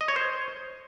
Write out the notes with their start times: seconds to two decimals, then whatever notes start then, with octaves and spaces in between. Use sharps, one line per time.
0.01 D#5
0.08 C#5
0.16 C5